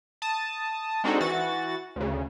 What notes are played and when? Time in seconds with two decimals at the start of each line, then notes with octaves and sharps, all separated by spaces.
0.22 A5 D#6
1.04 G#3 C4 D4 D#4 F#4 A4
1.21 E3 F#4 A6
1.96 D2 C#3